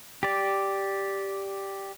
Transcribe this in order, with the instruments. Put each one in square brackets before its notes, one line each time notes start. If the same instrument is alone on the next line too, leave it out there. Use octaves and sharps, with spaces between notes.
[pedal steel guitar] G4 D5